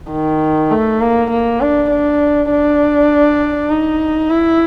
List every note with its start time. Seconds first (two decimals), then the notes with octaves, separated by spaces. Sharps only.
0.11 D#3
0.71 A3
1.01 A#3
1.31 A#3
1.61 D4
1.90 D4
2.51 D4
3.70 D#4
4.30 E4